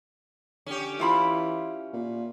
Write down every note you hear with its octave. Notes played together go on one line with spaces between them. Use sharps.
D3 C#4 G4
E3 E4 F4 B5
A#2